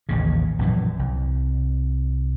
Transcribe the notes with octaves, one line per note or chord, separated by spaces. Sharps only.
A1 D#2 C#3
A#1 F#2 E3
C2